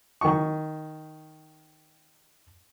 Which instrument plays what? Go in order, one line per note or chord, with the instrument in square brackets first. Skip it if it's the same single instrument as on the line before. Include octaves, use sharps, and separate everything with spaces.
[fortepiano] D#3 C#6